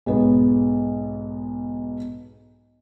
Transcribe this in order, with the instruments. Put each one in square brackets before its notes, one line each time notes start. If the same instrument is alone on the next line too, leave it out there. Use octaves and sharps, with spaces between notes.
[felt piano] B1 G#2 B3